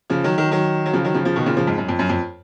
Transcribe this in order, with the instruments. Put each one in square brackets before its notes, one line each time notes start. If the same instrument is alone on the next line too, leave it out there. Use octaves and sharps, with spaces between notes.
[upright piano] C#3 F3
D#3 F#3
D#3 F#3
D#3 F#3
F#3
C#3 F3
D#3 F#3
C#3 F3
C#3 F3
B2 D#3
A#2 C#3
C#3 F3
F2 G#2
F#2
F2
F#2
F2